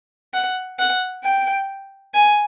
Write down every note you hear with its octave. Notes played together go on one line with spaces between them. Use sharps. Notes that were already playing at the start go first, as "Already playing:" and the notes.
F#5
F#5
G5
G#5